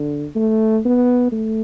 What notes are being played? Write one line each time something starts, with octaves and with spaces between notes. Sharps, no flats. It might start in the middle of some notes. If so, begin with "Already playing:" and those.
Already playing: D3
A3
B3
A3